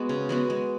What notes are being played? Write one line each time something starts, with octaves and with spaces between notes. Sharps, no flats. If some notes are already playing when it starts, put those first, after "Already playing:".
Already playing: G#3 B3 F#4
C#3
G#3 B3 F#4
G#3